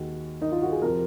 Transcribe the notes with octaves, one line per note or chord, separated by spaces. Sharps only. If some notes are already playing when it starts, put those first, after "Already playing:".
Already playing: D#2 D#3 G#3 F#4
D#4
F4
F#4
G#4
F2 C3 F3 A#4